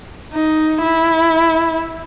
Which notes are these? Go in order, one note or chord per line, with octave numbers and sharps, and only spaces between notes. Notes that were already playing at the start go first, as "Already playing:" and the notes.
D#4
E4